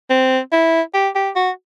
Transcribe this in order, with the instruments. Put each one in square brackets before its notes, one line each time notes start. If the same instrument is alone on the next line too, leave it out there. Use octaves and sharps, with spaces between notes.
[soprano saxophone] C4
E4
G4
G4
F#4